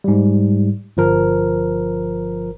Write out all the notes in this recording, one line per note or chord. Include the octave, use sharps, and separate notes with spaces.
G#2 G3
G1 F3 A#4